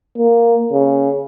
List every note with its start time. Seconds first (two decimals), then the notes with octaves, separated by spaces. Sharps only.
0.18 A#3
0.72 C#3